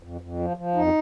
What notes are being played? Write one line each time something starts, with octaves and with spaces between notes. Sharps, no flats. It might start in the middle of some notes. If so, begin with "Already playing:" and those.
F2
F2
F3
F3
F2 D#4